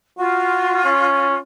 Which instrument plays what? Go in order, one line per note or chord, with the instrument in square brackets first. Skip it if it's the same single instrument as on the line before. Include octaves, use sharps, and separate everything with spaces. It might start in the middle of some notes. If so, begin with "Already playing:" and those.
[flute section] F4 [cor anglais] F#4
[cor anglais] C#4